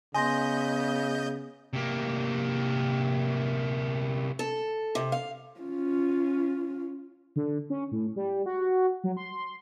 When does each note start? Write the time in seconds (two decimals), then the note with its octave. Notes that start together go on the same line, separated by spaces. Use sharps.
0.15 C#3 B3 D#5 G#5 C6 G6 A#6
1.73 C3 A#3
4.39 A4
4.95 C3
5.12 F5
5.60 C#4 F4
7.36 D3
7.70 C#4
7.92 A2
8.16 G3
8.46 F#4
9.04 F#3
9.17 C6